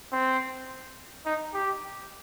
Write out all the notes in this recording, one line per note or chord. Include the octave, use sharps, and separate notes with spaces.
C4
D#4
G4